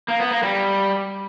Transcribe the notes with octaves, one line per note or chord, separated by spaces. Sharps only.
A#3
B3
A#3
G3